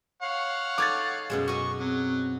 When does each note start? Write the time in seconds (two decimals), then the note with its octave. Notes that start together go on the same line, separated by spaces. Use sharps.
0.22 C#5 F5 F#5
0.78 D#4 A4 D6 G#6 A6
1.30 F#2 B2 G#3
1.48 F#4 D#5 C#6
1.80 F#3 C4